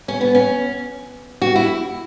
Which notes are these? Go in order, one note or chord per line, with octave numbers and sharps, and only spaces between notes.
C#4
B3
C#4
F#4
E4